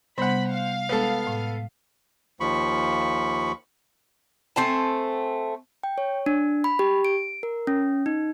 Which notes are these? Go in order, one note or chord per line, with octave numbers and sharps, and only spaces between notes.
C3 G3 B3 C5 F#5 B5
F5
G#3 B3 A4
A2
D#2 F3 B5 C#6
A3 C4 G#5 A5
G5
C#5
D4
B5
G4
D7
A#4
C#4
D#4